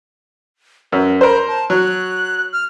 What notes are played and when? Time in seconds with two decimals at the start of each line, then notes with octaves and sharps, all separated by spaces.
0.92 F#2 B4
1.21 A#4 C5 B5
1.48 A5
1.70 F#3 F#6
2.53 F6